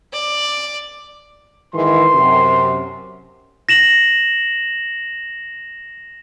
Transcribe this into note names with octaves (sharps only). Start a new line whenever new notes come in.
D5
G#2 D#3 E3 C6
F#2 C3
A#6 E7 F#7